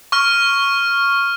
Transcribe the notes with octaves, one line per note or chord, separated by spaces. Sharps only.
C#6 F6